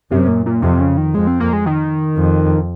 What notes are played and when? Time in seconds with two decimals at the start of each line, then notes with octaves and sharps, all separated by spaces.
0.11 F#2 C3
0.28 A#2
0.46 A#2
0.62 F2 C3
0.80 C#3
0.97 D#3
1.14 F2 G#3
1.27 C4
1.40 A#3
1.53 G#3
1.66 D#3
2.17 F2